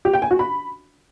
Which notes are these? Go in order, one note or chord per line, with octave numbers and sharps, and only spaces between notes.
G4
G5
G#5
F#4
B5